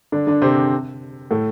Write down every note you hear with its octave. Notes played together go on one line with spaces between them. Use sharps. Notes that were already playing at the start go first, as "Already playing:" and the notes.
D3 D4
D3 D4
C3 C4
A2 A3